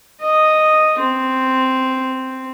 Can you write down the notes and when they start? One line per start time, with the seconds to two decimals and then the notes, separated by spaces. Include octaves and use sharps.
0.20 D#5
0.99 C4